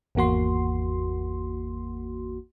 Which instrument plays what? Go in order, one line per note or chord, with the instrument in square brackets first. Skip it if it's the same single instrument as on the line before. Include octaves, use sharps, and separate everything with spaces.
[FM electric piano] G#1 E2 A#3 F#4 C6